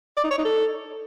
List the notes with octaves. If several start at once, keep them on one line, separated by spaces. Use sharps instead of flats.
D5
D#4
C#5
D#4
A4